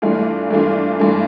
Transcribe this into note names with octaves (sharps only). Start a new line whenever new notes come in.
G2 E3 A3 D4 F4
G2 E3 A3 D4 F4
G2 E3 A3 D4 F4